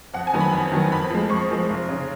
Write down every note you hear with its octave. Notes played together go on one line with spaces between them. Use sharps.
F2 F#5
G#5
D#3 F#3 B3
B5
F2
D#3 F#3 B3
F2 B5
F3 G#3
F2 C#6
F3 G#3
F1
C#3